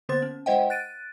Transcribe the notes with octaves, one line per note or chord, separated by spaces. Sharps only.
D3 A#3 B3 C5 C6 A6
C#4
G#3 E4 C5 D#5 F#5 G5
F#6 A6 D7 D#7